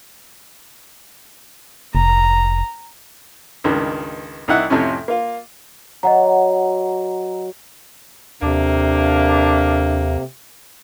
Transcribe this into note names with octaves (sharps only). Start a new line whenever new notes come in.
F1 A#5
C#2 G2 D#3
C2 D#4 E4 F#5
F2 A2 C3 C#4
A#3 F4
F#3 D#5 F#5 A#5
D#2 C3 A3 A#3 D4